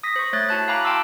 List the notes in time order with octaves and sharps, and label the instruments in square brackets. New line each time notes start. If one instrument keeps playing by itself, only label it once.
[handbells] D#6 A#6 B6
C5 C#6
A3 C#5 F#6 A6
E4 F#4 A5 F#6
F5 G#5 A#5 B5 D6 F#6
G5 A5 C6 D6 E6